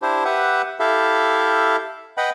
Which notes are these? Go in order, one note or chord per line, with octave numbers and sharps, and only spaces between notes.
D4 E4 G4 C5
G4 B4 E5 F#5
E4 G4 A4 E5 F5
B4 D#5 F#5 G5 B5